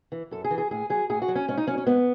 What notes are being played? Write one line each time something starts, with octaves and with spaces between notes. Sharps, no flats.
E3
F#2 A4
G#4
E3
G#4
A2 G#4
F#3 G#4
A2 G#4
F#4
F#3
C#4
G#2 C#4
D#4
F#3 C#4
C#4
G#2 B3